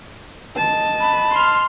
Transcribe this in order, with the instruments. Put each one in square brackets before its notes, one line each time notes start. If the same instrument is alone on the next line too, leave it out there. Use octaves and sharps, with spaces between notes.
[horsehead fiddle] D#5 A5
[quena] B5
[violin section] C6 F6